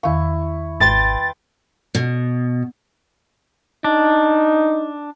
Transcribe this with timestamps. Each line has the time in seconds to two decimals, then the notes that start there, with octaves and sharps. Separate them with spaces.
0.03 E2 D#3 E4 F5 C#6
0.80 G#1 B4 G5 C6 A6
1.95 B2
3.84 D4 D#4